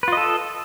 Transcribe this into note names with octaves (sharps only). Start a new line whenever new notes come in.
F4 A4 B4 D#5